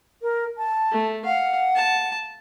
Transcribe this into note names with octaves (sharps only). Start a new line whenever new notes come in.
A#4
A5
A3
F5 F#5
A5